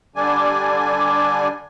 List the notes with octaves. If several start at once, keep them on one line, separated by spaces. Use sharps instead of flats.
D3 G3 D4 G#5